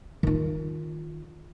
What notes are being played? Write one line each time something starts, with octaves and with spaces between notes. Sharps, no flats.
D#3 F4